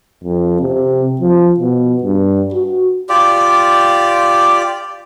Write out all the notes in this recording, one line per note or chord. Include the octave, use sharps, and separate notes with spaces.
F2
C3
F3
B2
G2
F#4
F4 G4 D5